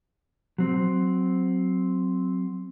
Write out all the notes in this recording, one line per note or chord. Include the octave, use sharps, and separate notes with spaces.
F#3 C4